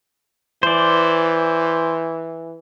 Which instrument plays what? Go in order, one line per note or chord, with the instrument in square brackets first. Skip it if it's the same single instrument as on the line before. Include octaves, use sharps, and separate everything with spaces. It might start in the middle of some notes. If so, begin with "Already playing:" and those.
[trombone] E3 [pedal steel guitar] C5 D5